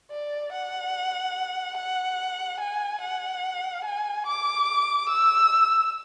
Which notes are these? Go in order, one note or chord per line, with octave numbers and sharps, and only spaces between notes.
D5
F#5
F#5
G#5
F#5
G#5
D6
E6